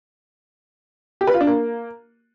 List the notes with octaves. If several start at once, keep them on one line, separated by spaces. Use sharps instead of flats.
G4
B4
F4
D4
A#3